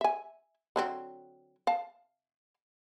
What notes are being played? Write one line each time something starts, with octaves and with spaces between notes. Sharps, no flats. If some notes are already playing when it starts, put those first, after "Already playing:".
E5 G#5
D3 F#3 C4
F5 A5